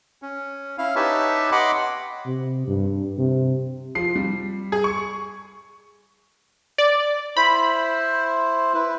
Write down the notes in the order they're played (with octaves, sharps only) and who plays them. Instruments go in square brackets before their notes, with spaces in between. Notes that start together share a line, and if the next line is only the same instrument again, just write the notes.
[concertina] C#4
C#4 E4 F5
D#4 G4 B4 C#5 E5 A5
D#5 F#5 B5 C6 D6
[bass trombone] C3
G2
C3
[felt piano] F3 [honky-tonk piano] C7
[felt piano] G3
[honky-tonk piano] G#4
C#6
[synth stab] D5
[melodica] E4 C5 [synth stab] B5
[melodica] E4 B4